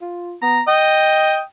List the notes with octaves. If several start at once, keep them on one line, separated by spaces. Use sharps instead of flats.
F4
B3 A#5
D#5 G5